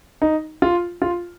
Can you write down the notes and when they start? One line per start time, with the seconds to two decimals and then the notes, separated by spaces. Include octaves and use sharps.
0.22 D#4
0.62 F4
1.02 F4